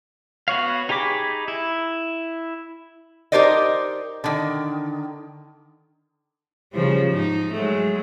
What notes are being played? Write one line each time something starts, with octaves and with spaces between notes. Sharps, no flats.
B3 F#4 C#5 F5
D#4 G4 G#4 B5 D6
E4
D#4 G4 A#4 C5 D5 D#5
D3 D#3
C#3 F3 G3
G#2 D#4
F#3 G#3 A3